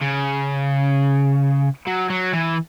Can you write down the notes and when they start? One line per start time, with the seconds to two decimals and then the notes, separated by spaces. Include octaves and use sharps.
0.01 C#3
1.87 F#3
2.10 F#3
2.33 E3